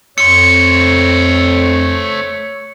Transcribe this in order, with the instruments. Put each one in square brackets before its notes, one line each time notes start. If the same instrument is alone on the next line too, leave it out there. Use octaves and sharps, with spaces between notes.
[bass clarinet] F2 [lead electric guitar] A3 C5 [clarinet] C#5 [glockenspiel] C#7